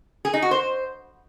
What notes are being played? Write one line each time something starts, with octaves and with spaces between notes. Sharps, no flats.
G#4
D#4
F#4
C5